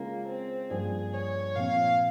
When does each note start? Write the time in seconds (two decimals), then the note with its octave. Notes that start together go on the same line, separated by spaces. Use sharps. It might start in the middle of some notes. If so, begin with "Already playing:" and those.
Already playing: C#3 G#3 A#3 C#4 F4
0.27 C4
0.70 G2 F3 A#3 F4 G#4
1.13 C#5
1.55 A#2 F3 C4 F5